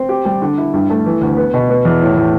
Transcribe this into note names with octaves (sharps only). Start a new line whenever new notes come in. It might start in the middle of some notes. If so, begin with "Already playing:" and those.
Already playing: C4
G4
G3
D3
E4
G2
A3
E3
D2
B3
B2
B3
E2
A2
A2